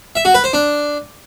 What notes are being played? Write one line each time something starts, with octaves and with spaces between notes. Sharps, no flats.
E5
F#4
B4
C5
D4